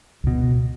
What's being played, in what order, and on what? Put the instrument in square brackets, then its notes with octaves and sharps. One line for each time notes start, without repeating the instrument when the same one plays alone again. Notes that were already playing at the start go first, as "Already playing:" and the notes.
[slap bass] C#2 B2